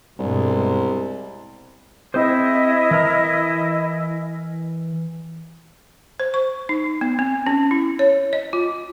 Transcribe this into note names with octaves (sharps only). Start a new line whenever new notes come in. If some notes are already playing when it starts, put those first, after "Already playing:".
C2 G2 B2 G#3
C4 E4 G#4 C5 D#5
E3 A#4 A#5
C5
C#6
D#4
B3
C4
C#4
E4
C#5
D#5
F4